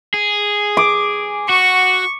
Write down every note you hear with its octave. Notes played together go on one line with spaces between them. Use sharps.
G#4
D6
F#4 C#6